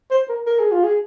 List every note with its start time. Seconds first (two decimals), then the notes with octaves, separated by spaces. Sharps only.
0.11 C5
0.29 A#4
0.47 A#4
0.59 G#4
0.71 F4
0.84 G#4